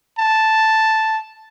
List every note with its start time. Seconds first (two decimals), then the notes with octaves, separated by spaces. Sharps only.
0.19 A5